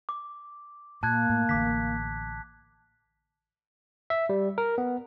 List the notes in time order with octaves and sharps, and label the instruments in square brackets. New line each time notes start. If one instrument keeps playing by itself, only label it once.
[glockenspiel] D6
[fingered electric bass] A#2 [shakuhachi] A#3 [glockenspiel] A5 F#6 G#6
[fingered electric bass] A2
[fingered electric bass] A1 D3 [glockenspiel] D6 B6
[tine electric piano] E5
G3
A#4
B3